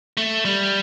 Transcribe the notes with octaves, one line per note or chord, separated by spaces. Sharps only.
A3
G3